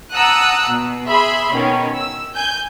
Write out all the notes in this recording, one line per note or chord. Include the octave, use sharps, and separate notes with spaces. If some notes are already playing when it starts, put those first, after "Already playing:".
F#5 A5 A#5 D#6 E6 F#6
B2
G#4 E5 B5 C6
B2 D#3 C#4
E6
G#5 G6